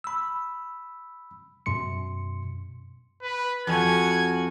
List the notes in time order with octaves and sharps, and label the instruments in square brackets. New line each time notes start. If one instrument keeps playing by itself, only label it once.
[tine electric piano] B5 E6
F#2 B2 C6 C#7
[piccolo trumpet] B4
[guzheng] F2 [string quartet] F#4 G#5 [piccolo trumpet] G#6